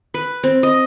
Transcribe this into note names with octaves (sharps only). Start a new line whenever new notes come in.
B4
C4
D#5